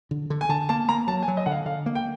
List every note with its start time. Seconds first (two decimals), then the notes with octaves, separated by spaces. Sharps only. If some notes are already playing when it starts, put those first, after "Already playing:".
0.11 D3
0.30 D3
0.41 G#5
0.49 D3 A5
0.69 A#3 A5
0.89 A#3 A#5
1.07 F#3 A5
1.23 G#5
1.28 F#3
1.37 D#5
1.46 D3 F#5
1.52 F5
1.66 D3 F5
1.86 A#3
1.95 G5